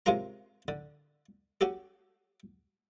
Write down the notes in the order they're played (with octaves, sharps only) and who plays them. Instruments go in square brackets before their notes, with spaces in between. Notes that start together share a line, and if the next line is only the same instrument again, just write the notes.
[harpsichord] C3 G#3 C#4 F4 A#4 A#5
D3
C#4 F#4 G4 A4